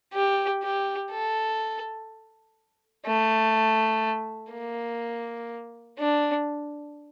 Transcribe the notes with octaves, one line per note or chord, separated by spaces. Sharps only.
G4
G4
A4
A3
A#3
D4